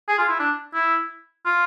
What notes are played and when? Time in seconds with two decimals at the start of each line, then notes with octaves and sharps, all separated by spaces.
0.09 G#4
0.19 F4
0.29 E4
0.39 D4
0.74 E4
1.46 F4